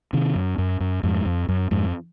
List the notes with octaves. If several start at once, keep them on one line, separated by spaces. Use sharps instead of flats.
C3 D#3
F#2
F#2
F#2
F2 G#2
F2
F#2
F2 G#2